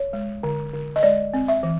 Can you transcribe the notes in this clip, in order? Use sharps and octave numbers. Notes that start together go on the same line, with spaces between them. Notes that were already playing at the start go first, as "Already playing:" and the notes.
Already playing: C#5
G#3
D3
D3
D#5
G#3 D5
C4
E5
E3